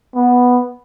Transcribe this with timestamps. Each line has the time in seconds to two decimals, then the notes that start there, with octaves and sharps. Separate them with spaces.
0.15 B3